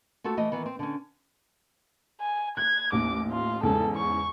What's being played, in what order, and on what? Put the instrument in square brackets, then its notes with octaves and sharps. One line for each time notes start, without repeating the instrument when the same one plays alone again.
[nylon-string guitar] A3 F4 F#4 A4
E3 A3 D#5
D#3 E3 B3
C4
D3 C#4
[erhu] G#5
[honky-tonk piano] F#6 [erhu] G#6
[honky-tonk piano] A1 D#2 [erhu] D6
[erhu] F4
[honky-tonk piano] E2 G#2 C#3 [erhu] A4
[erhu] C#6